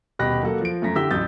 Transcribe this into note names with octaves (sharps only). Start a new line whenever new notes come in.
D#1 B2 G4 B5 F#6 A#6
F#3 A#3 F#4 A4
F3 D7
F#2 A3 A#5 A#6 B6
D3 E4 G4 E6 B6 G7
A1 E2 F#3 D#6 G6 A6